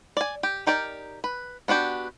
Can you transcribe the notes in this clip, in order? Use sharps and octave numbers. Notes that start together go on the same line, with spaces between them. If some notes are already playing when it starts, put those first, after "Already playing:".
D5 G#5
G4
D#4 G4 A#4 D5
B4
B3 D4 F#4 G4